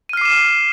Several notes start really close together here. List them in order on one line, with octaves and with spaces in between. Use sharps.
D#7 F6 C7 D6 E7